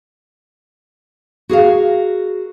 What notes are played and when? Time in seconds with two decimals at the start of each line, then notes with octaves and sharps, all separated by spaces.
1.49 F#4 G#4 A#4 F5